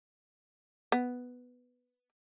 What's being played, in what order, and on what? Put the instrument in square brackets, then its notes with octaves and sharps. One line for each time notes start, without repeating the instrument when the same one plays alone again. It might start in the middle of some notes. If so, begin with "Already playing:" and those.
[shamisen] B3